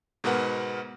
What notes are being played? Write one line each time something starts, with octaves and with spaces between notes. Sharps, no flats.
G#2 B2 A#4 B4 F#5